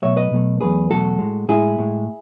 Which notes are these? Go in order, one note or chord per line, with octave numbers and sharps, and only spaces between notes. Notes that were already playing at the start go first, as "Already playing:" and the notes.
B2 F#3 A3 C#5 E5
B4 D#5
B2 F#3 A3
E2 B2 F#3 A3 G#4 B4
E2 B2 F#3 A3 F#4 A4
A2 G#3
A2 G#3 E4 G#4
A2 G#3